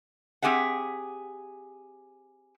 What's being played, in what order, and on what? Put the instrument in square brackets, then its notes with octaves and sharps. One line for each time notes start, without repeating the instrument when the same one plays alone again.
[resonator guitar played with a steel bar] C4 G4 G#4 E5 F#5